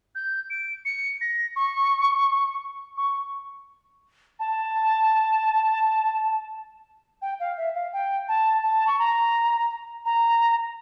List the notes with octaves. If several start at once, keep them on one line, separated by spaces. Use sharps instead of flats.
G6
D7
C#7
A#6
C#6
C#6
A5
G5
F5
E5
F5
G5
A5
A5
C#6
A#5
A#5